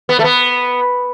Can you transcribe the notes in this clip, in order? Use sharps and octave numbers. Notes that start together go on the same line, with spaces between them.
B3
A3
B3